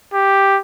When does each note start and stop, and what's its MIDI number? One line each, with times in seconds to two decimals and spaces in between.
0.14 0.60 67